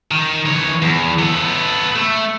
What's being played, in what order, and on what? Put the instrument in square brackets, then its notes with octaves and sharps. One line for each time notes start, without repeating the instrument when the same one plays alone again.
[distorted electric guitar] D#3
E3 C#5
E2
B3 A4
A3